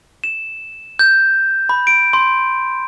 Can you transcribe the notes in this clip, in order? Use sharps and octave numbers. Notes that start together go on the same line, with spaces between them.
E7
G6
B5
D7
C6